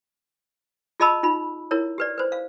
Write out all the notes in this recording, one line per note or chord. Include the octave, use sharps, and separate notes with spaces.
F4 G#4 D#5 A5 B5 E6
D#4 F4 B5
E4 A#4 C#5
G4 B4 D5
B4 C5
F5